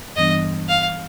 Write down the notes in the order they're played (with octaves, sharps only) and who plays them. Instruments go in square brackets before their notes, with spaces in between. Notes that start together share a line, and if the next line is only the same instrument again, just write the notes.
[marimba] G2 E3 G3 B3 D4 [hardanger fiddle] D#5
[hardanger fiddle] F5